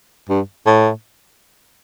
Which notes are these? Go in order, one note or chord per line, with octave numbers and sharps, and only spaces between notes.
G2
A2